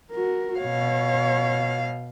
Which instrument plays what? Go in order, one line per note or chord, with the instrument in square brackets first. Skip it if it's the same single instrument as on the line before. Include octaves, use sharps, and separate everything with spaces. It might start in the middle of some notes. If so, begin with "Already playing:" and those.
[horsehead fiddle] F#4 A#4
[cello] B2 F5 [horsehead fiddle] C#5